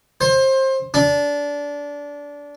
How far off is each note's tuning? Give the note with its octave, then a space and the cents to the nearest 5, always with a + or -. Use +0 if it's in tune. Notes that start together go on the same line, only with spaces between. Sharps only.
C5 +25
D4 -20